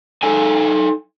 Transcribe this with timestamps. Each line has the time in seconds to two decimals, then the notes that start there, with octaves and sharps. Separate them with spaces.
0.23 D#4 A4 G#5